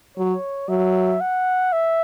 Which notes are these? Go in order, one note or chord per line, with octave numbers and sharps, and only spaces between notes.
F#3 C#5
F#3 E5
F#5
E5